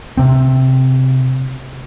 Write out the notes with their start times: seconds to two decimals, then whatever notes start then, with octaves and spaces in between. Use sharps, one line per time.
0.17 C3 C4